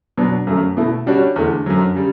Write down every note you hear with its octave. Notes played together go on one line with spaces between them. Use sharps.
B2 F#3 B3 D4
F#2 C#3 F#3 A3
B2 A3 E4
C#3 G3 D4 F#4 C#5
E2 D3 A3
F#2 D3 F#3
C#3 G3